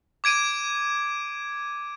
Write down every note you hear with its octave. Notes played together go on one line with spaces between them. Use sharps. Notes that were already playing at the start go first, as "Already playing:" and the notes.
D6 G#6 D7 D#7